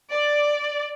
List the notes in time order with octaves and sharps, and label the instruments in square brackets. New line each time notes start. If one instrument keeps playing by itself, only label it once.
[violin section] D5